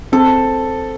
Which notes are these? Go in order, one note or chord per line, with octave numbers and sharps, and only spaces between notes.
C4 A4